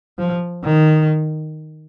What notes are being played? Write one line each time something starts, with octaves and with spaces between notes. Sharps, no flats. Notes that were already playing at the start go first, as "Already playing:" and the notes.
F3
D#3